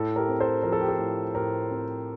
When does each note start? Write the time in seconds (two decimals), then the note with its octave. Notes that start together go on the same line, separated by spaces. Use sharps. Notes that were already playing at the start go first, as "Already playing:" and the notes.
Already playing: A2 A4
0.16 G4 A#4
0.28 C4
0.40 A4 C5
0.63 F3 A#4
0.72 A4
0.81 G4
0.89 A4
0.99 A2
1.34 A2 G4 A#4
1.71 C4